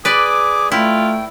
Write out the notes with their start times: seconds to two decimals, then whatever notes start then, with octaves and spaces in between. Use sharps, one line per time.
0.05 G#4 B4 D5 D6
0.72 A3 E4 F4 G5